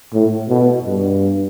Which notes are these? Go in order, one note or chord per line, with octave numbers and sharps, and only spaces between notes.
A2
B2
G2